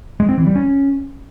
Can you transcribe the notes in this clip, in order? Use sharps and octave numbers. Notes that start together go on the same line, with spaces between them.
G#3
C4
E3
G3
C#4